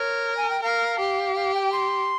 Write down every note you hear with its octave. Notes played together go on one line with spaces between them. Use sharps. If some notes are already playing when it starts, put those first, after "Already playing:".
Already playing: A#4 C#5
G#5
G5
A#4 F5
G4
F5
G5
C6